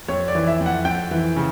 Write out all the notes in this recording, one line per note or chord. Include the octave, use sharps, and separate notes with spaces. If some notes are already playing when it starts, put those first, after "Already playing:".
F2 C#5
D5
E3
E5
F2
F#5
F2 G5
E3
C#3